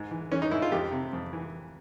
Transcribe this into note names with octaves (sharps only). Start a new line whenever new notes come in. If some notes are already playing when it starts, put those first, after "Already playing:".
Already playing: G#2
E3
E3 C#4
D#4
G#2 E4
F4
F2 G4
C3
F2
E3